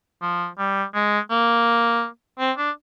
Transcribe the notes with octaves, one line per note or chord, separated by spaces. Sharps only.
F3
G3
G#3
A#3
C4
D4